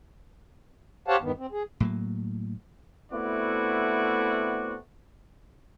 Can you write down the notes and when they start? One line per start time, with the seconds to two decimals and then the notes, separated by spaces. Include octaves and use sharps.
1.08 G4 C5 C#5 F5 F#5 A5
1.21 E2 G2 D#3 B3
1.38 C4
1.52 G#4
1.80 A2 F#3 A#3
3.12 A3 B3 C4 E4 F#4 D5